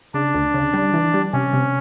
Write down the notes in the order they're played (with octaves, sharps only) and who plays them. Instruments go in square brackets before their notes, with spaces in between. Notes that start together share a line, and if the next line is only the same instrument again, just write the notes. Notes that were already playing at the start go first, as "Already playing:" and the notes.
[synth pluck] C#3 [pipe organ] D4
[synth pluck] D2
C#3
G3
E3
G3
[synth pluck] C3 [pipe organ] C#4
[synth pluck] C3